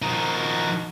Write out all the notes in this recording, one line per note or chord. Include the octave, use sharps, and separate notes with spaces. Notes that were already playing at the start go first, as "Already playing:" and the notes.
D#3 F3 D#4 F#4